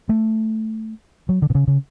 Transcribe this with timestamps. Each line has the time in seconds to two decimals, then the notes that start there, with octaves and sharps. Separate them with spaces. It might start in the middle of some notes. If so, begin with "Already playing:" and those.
0.09 A3
1.29 F#3
1.42 D3
1.50 B2
1.55 C#3
1.67 C#3